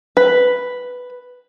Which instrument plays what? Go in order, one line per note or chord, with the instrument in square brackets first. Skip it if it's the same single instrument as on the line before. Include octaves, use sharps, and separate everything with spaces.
[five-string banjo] B4